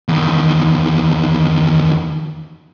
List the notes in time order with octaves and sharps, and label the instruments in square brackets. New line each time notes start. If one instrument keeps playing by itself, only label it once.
[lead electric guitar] E2 D#3